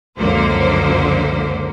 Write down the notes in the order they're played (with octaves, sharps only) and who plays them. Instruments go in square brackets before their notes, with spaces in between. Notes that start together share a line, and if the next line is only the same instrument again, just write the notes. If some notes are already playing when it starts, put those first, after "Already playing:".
[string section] C#2 F#2 D3 F3 A#3 C5